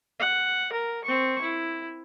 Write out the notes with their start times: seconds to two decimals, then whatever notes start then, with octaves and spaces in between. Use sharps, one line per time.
0.20 F#5
0.73 A#4
1.04 C4 C#6
1.41 E4